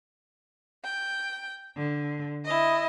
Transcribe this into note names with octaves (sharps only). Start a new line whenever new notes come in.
G5
D3
E4 D#5